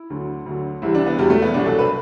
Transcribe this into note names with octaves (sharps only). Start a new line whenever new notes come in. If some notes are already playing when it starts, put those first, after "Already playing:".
Already playing: E4
D2 D3 F#3
D2 D3 F#3
C2 C3 E3 E4
D4
B3
E2 B2 F#3 G3
A3
B3
C2 B2 F#3 D4
A4
B4